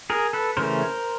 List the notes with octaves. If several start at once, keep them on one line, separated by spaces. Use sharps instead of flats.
G#4 A#4
A4 B4
C#3 E3 A3 C#4 A#4 C5